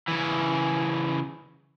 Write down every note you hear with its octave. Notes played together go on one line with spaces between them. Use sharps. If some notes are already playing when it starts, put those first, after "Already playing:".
C#3 E3